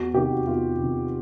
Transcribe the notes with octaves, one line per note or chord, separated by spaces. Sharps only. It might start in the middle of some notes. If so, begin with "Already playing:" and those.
Already playing: E2 F#4
C3 D#3 G4
F#4
E2 F4
C3 D#3